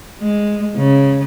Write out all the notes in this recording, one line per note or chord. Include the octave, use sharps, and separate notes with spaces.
G#3
C#3